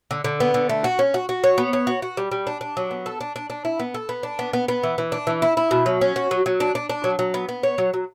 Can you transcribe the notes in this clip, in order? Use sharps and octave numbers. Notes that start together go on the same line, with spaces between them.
D3
D3
B3
D3
A3
F#4
C#4
F#4
F#4
C#5
B3
C#5
F#4
F#4
G3
G3
D4
D4
F#3
B3
A4
D4
D4
D4
E4
B3
A4
B3
D4
B3
B3
B3
E3
E3
D4
E3
E4
E4
B2
F#3
C#4
F#4
F#3
F#3
D4
D4
D4
F#3
F#3
B3
B3
C#5
F#3
F#3